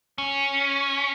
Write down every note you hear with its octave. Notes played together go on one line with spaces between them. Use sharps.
C#4